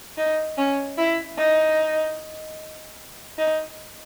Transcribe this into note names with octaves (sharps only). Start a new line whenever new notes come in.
D#4
C#4
E4
D#4
D#4